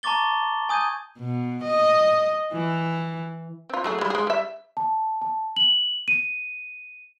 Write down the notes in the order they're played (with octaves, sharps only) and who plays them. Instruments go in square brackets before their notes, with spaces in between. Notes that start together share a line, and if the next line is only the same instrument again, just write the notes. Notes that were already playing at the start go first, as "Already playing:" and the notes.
[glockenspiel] A5 A#5 C#6 D6 A6 G7
G#5 D#6 G6 G#6 D#7
[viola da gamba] B2
D#5
E3
[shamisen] C4 F4
F#3 A3 G#4
G3 G#3
G#3 G#4
G3 E5
[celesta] A5
A5
F#7
D#7